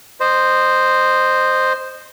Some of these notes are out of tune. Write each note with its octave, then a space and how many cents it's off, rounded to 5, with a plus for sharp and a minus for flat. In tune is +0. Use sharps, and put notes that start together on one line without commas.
C5 +0 D#5 -20